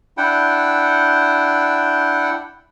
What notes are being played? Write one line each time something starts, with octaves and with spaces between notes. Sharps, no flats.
D4 E4 F#5 G5